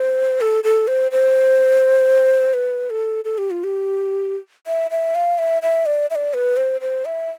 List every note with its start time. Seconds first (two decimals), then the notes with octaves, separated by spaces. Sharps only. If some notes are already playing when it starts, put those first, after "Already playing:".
Already playing: C5
0.41 A4
0.64 A4
0.88 C5
1.12 C5
2.54 B4
2.90 A4
3.25 A4
3.38 G4
3.51 F4
3.64 G4
4.67 E5
4.91 E5
5.15 F5
5.39 E5
5.62 E5
5.86 D5
6.10 E5
6.15 D5
6.34 B4
6.57 C5
6.81 C5
7.05 E5